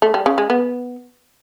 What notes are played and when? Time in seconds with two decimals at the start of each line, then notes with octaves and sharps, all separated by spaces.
0.02 A3
0.14 G3
0.26 C#3
0.38 G#3
0.50 B3